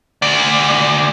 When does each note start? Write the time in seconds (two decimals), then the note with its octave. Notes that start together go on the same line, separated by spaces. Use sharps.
0.22 D2 D5